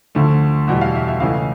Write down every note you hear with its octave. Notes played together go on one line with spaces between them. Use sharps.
D2 D3 F3 A3
E2 B2 G3 F#5
F5
E5
E5
C#2 C#3 E3 A3 F5